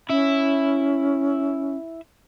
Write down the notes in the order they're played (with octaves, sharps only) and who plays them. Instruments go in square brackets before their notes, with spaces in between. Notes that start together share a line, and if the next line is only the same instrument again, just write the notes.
[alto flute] C#4 [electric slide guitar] E4 E5